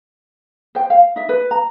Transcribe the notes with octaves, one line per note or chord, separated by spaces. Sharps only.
C5 G5
F5
D#4 E5
B4
A#5